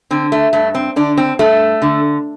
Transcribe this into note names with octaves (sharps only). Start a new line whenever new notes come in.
D3 C4
A3
G2 A3
C4
D3 D4
C4
G2 A3
D3